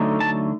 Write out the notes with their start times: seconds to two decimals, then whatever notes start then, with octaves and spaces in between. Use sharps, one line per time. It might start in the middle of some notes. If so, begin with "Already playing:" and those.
Already playing: D3 F#3 A3 D#4
0.20 A5